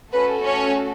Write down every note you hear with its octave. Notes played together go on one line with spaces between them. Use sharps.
A3 C#4 F#4 A4 B4
C#4 C#5